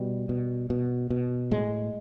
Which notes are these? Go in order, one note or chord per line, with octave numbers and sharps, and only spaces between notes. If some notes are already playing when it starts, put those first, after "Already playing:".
Already playing: B2 G3
B2
B2
B2
A2 G#3